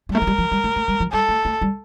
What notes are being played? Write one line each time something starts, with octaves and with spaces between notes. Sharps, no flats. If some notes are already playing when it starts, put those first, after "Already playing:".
G3
A3 A#4
F3
G3
F3
G3
A3
A3
G3
F3
G3 A4
A3
A3
G3